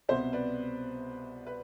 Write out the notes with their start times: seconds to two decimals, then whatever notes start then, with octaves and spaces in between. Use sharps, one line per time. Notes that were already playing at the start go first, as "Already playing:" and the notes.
0.09 C2 B2 B3 C5 E5
0.33 B4 D5
1.47 B4